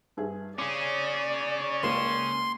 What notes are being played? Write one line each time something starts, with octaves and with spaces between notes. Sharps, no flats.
G2 G#4 E5
C#4 G#4 D5 D6
C#2 A#3 C6 E7